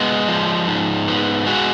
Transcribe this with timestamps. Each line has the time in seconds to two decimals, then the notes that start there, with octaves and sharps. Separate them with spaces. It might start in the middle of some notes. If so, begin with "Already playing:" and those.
Already playing: G#3 B3 G#4
0.28 F3
0.67 G#2
1.08 B3
1.47 G#3 F#4